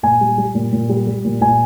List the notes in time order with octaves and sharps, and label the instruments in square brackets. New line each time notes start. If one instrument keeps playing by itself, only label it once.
[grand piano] A#2 G#5
G3
G3
A#2
A#2
G3
G3
A#2
A#2 G#5